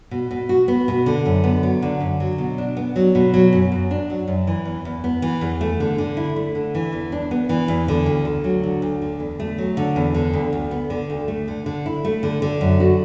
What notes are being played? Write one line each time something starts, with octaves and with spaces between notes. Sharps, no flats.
B2
B2
F#4
B3
B2
D3
F#2
B3
F#3
D3
F#2
F#3
B2
D4
B3
F#3
B2
F#3
F#2
F#2
D4
F#3
F#2
E3
E2
E2
B3
E3
E2
A3
D3
D3
E4
A3
D3
E3
E2
D4
B3
E3
E2
D3
D2
D2
F#3
D3
D2
D3
E2
A3
F#3
D3
E2
D3
D2
D2
B3
D3
D2
A3
D3
D3
E4
A3
D3
D3
F#2
F#4